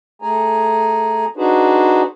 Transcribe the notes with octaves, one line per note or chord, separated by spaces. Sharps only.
A3 G#4 G#5 A#5
D4 D#4 F#4 G#4 B4 C5